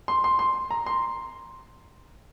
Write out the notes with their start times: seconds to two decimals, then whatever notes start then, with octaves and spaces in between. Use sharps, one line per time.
0.08 C6
0.24 C6
0.39 C6
0.70 A#5
0.86 C6